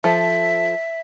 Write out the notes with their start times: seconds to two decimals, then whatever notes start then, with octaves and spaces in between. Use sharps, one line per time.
0.04 F3 A4 E5